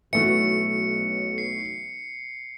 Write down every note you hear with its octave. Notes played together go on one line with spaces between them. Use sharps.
B1 E3 A3 F#4 C#7
C7